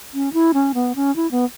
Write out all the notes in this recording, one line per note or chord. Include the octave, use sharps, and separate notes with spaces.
C#4
E4
C#4
B3
C#4
E4
B3